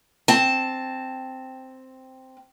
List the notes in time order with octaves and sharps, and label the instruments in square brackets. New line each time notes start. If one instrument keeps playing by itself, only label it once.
[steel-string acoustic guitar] C4 A5